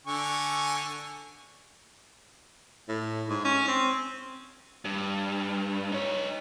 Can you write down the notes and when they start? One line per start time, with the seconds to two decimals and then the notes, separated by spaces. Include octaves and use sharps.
0.07 D3 G#5 C#6
2.89 A2
3.29 G#2
3.45 C#4
3.68 C4
4.85 G2
5.93 D#4 C#5